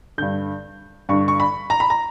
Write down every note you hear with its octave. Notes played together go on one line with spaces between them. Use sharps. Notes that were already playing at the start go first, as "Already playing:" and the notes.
G2 D3 G6
G2 D3 C#6
C#6
B5
A#5
B5
A#5